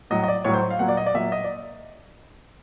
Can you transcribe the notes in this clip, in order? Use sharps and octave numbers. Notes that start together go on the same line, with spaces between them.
A2 F#3 D#5
D#5
D5
A2 F#3 C#5
C5
F5
A#2 F#3 F#5
D5
D#5
D5
A#2 F#3 E5
D#5
D5